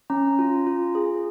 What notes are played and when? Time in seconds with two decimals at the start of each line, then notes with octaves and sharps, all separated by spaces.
0.10 C#4 A#5
0.39 F4
0.67 F4
0.95 G#4